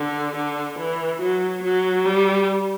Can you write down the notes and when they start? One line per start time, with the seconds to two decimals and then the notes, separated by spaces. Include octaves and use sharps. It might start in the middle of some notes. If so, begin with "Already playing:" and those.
Already playing: D3
0.36 D3
0.79 E3
1.21 F#3
1.63 F#3
2.05 G3